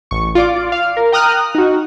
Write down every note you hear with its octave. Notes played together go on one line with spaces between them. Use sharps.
A1 C#6
F4 D5 D6
F5
A#4
G5 A#5 D#6 F6 F#6
D#4 F#4